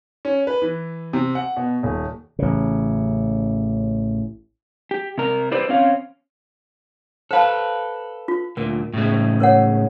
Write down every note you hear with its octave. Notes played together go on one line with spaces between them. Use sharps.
C#4
B4
E3
C3
F#5
B2
D#1
A1 C#3
G4
C3 A#4
E4 G4 B4 C5 D5
C4 C#4 F5
A4 B4 C5 F5 A5
F4
D2 A#2 A#4
A2 C#3 G#3
A#4 C#5 F#5